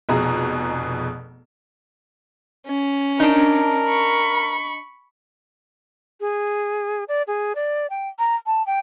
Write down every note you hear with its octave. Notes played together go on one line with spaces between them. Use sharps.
F1 F2 B2 G#4 A#5
C#4
D4 D#4 A#4
B5 C#6
G#4
D5
G#4
D5
G5
A#5
A5
G5